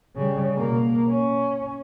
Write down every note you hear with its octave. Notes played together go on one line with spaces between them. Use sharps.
C#3 G3
B2 A#3
C#4